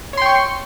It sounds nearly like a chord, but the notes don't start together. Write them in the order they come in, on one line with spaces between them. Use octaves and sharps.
C#5 C6 G5 C#6